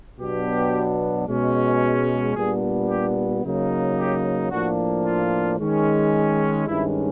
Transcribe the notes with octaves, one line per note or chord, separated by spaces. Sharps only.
B2 F#3 B3 D4 G4
B2 G#3 C#4
A#2 G3 B3 D4 G#4
G4
C#3 F#3 A#3 D#4
G4
A2 F3 A#3 D4 F#4
F4
D#3 G#3 C#4
G2 D#3 G#3 C#4 E4